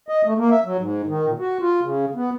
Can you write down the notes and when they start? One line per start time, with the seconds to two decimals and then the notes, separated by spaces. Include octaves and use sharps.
0.09 D#5
0.24 A3
0.38 A#3
0.51 E5
0.66 F#3
0.79 G#2
1.07 D#3
1.26 A#2
1.39 F#4
1.61 F4
1.82 C#3
2.15 B3